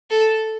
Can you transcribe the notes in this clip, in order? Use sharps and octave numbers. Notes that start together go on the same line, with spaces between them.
A4